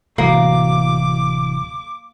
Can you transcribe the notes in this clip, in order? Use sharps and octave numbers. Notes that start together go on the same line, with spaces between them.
D1 B1 C3 E3 F#3 A#3 D6